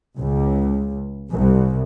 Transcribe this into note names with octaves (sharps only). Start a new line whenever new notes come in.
C#2
C2